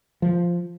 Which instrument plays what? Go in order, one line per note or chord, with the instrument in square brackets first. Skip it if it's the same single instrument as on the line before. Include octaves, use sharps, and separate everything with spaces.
[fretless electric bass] F3